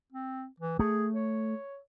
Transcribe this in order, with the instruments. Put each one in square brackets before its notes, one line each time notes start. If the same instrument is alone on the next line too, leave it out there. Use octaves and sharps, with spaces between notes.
[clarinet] C4
E3
[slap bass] A3 [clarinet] G#4
[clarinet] C#5